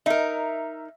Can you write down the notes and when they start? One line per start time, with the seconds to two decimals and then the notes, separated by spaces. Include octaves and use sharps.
0.06 D#4 A#4 E5